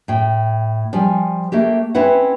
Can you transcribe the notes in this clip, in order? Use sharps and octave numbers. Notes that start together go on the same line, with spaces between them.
A2 G5
F3 G3 G5 G#5
A3 A#3 G4
C4 C#4 E4 B4 F#5